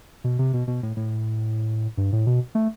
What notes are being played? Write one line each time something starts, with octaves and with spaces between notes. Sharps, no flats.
B2
C3
B2
B2
A2
A2
G2
A2
B2
A3